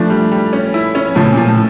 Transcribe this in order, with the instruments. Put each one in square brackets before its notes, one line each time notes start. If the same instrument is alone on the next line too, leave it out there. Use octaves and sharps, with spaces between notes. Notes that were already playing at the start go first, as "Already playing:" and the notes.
Already playing: [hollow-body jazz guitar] F3 A3 [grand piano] D4
[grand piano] G3
G3
C#4
E4
C#4
[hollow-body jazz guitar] A2 C#3 [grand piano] F3
[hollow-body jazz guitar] A#2 [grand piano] F3
[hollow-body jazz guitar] A2